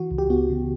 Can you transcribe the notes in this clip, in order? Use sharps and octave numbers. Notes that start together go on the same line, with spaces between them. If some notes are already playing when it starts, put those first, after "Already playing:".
Already playing: E3 F#4
C#2
G4
B3 F#4
C#3